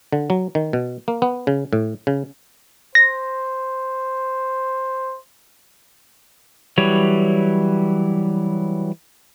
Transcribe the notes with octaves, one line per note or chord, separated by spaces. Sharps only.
D3
F#3
D#3
B2
A#3
B3
C#3
A2
C#3
C5 A#6
E3 F#3 G3 C#5